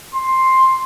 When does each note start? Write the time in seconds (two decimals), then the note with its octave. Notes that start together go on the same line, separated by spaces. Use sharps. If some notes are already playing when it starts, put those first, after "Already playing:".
0.15 C6